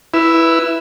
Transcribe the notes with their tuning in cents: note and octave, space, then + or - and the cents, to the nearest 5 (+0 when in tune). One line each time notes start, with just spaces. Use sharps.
E4 +0 B4 +0 E6 +30